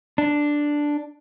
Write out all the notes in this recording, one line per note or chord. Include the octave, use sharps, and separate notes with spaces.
D4